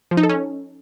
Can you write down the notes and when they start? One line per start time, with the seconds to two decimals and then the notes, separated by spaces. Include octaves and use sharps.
0.11 F3
0.17 D#4
0.23 A4
0.29 C#4